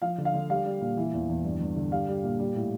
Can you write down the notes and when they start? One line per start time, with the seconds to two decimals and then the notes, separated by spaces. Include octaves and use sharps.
0.02 F3 F5
0.18 D3
0.25 F5
0.34 D3
0.50 G3 F5
0.66 G3
0.81 A#2
0.97 E3
1.13 E2
1.29 E2
1.45 G2
1.60 G2
1.76 D3
1.92 G3 F5
2.08 G3
2.24 A#2
2.40 G3
2.55 A2